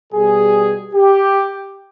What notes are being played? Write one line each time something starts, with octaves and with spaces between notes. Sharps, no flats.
B2 G3 G#4
G4